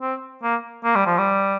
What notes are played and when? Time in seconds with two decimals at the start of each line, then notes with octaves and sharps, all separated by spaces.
0.01 C4
0.43 A#3
0.85 A#3
0.96 G3
1.07 F3
1.18 G3